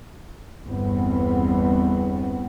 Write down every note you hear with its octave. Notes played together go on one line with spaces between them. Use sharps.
G1 E2 B3 C4